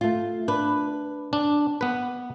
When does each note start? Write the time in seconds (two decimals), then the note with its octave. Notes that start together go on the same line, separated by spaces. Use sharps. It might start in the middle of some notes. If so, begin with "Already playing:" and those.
0.01 A3 F4
0.48 D4 B4
1.33 D4
1.81 B3 B4